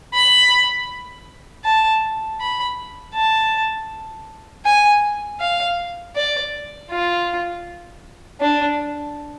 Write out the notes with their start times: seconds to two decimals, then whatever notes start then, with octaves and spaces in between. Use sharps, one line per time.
0.14 B5
1.64 A5
2.40 B5
3.15 A5
4.65 G#5
5.40 F5
6.16 D5
6.91 F4
8.41 D4